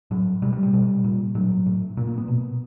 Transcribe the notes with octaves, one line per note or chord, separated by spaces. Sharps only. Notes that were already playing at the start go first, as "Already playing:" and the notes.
A2 F#3
B2 G3
G3
G3
B2 G3
A#2
A2 F#3
A2
A#2 A#3
A#3
B3
B2